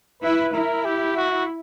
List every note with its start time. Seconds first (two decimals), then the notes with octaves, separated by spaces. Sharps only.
0.22 E4 B4
0.53 E4 A#4
0.85 G4
1.17 F#4